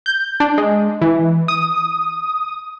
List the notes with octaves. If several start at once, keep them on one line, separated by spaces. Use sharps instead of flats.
G6
D4
G#3
E3
D#6